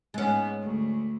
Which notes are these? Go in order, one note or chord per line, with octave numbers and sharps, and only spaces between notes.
G#2 G#3 B3 C#4
D2